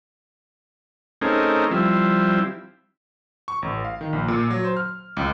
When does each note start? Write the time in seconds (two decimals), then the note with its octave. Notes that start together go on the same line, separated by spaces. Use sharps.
1.22 A3 C4 C#4 D#4 G#4 A#4
1.71 F3 G3 C4 E4
3.48 C#6
3.62 A1
3.84 F5
4.01 D#3
4.13 A#1
4.28 A#2
4.50 F#3
4.64 C5
4.77 F6
5.17 C#2